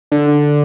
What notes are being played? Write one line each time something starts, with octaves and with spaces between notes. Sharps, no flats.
D3